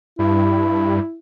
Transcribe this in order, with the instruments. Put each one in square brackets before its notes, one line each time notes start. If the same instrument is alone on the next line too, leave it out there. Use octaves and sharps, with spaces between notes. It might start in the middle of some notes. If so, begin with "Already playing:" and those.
[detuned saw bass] G2 [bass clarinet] E4